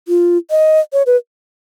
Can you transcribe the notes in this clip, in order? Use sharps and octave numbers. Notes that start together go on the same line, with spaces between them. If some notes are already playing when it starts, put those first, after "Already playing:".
F4
D#5
C#5
B4